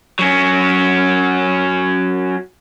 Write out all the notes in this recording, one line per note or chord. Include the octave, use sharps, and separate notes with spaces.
F#3 C#4